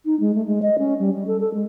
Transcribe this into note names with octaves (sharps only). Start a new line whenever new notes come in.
D#4
G#3
A3
G#3
D#5
C#4
G3
G3
A4
A4
G#3